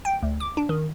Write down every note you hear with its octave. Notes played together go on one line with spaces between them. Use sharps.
G5
D2
D6
D4
D#3